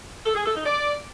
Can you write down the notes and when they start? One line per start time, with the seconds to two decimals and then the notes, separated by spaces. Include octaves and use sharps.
0.25 A4
0.35 G#4
0.45 A4
0.55 D#4
0.65 D5